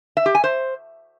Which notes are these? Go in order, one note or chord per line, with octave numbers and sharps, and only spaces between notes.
E5
G4
G#5
C5